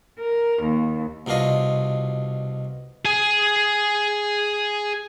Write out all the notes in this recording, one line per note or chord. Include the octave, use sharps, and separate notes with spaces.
A#4
D#2
C2 B2 D4 F4 D#5
G#4 G#5